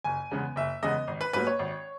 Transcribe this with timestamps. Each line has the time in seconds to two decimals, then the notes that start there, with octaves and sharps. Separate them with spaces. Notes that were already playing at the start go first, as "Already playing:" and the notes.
0.04 F#1 G#5
0.31 E2 C#3 G#3 B3
0.56 F#1 E5
0.83 E2 C#3 G#3 B3 D#5
1.08 G#1
1.21 B4
1.33 G#2 F#3 A#3 B4
1.47 C#5
1.59 G#1